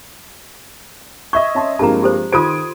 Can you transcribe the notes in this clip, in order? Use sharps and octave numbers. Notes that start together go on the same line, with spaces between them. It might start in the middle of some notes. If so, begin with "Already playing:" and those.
D#5 E5 C#6 G#6
C#4 A5 C6
G2 F3 G#3 A#3 C4 A5 A#5
G4 A4 C5
D#3 F4 A4 C5 C6 D#6 G#6 D7